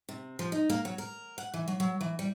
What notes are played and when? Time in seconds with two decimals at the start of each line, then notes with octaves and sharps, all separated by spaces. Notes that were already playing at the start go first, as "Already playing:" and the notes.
0.09 C3
0.39 F3
0.52 D#4
0.70 A#3
0.85 F#3
0.98 A#4
1.38 F#5
1.54 E3
1.68 F#3
1.80 F#3
2.01 E3
2.19 G3